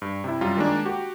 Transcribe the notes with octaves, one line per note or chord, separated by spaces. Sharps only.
G2
C3 E4
F#2 G3 F4
D#3 G#3 A#3 D4
F#4 G4